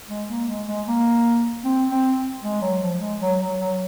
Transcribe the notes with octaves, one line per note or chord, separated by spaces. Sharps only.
G#3
A#3
G#3
G#3
A#3
C4
C4
G#3
F#3
F3
G#3
F#3
F#3
F#3